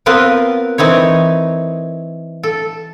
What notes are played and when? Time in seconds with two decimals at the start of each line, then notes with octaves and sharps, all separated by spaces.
0.06 B3 C4 F4 A#4 B4
0.78 E3 C4 D#4 C#5
2.43 A4